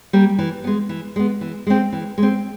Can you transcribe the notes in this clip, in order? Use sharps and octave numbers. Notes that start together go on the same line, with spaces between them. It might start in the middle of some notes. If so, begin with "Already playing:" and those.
G3 A#3
E3
G#3 B3
E3
G#3 B3
E3
G#3 C4
E3
G#3 C4